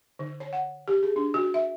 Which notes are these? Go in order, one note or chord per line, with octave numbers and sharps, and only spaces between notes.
D3
C#5
F#5
G4
G#4
D4
F#4
E5